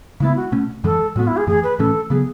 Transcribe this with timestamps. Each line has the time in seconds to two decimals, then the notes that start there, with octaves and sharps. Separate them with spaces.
0.20 C#3 G#3 B3 E4
0.36 F#4
0.52 B2 A3 C#4
0.84 F#2 E3 G#3 A4
1.16 A2 G#3 B3 F#4
1.27 E4
1.36 G#4
1.47 F#2 E3 A3 G#4
1.63 B4
1.78 A2 E3 A3 C#4 A4
2.10 C#3 F#3 B3 G#4